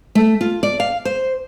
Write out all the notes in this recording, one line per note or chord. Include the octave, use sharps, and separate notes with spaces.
A3
F4
D5
F5
C5